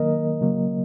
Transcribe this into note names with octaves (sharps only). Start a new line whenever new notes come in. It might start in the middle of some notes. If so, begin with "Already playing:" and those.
Already playing: D#3 F#3 A#3 A#4 D#5
C#3 F#3 A#3